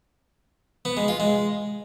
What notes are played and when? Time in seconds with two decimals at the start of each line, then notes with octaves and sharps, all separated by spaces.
0.85 B3
0.97 G#3
1.08 F4
1.20 G#3